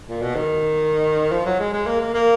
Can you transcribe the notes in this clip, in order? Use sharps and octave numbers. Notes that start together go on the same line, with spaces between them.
A#2
B2
D#3
F3
F#3
G#3
G#3
A#3
A#3
A#3